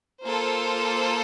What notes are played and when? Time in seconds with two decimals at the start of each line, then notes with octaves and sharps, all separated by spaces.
0.24 A#3 F4 A4 C5